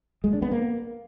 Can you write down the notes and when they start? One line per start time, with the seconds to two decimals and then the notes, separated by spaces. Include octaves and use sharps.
0.24 G#3
0.33 D4
0.42 B3
0.51 A#3